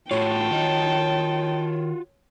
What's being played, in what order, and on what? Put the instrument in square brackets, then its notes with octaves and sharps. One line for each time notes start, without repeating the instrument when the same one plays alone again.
[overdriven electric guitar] A2 [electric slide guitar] F4 F#4 [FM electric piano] C#5 [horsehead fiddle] G5 A5
[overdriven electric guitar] D#3 D#5